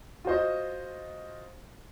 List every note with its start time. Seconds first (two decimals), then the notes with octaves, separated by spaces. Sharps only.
0.25 F4 F#4 C5 D#5